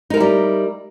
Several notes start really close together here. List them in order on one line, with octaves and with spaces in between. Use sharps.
D#4 A#4 E4 G3